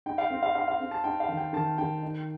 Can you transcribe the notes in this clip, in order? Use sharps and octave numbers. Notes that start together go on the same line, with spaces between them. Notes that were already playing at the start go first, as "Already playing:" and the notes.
D#4 G5
F5
C4
F5
D#4 F5
F5
C4
A5
D#4 G5
F5
D#3
G5
D#3 A5
D#3 G5
D#4